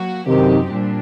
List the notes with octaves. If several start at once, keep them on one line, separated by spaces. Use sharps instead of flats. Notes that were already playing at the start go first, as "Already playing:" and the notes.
Already playing: F#3 A#3 F#4
F#2 C3 D#3 F#3 C4 D#4 G4
A#2 G3 D4